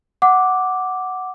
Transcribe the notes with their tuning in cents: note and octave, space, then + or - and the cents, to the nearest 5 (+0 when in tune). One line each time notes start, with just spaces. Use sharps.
F#5 +0 D6 +0